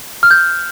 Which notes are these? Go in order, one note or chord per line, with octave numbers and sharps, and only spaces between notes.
F6
G6